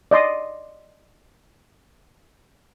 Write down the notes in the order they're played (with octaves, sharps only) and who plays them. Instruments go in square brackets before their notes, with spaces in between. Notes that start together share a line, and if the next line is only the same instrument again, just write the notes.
[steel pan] D5 D#5 C6 D#6